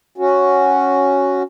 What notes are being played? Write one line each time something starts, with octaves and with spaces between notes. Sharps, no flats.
C#4 F#4